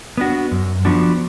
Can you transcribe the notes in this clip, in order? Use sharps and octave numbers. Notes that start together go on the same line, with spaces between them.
B3 D4 F#4
F#2
F3 B3 D4 F#4